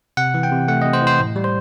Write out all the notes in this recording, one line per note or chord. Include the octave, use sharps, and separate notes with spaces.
C3 F#5
E3
G5
C3
A3 F#5
C3 D#5
C5
E3
C5
A2
G3
C5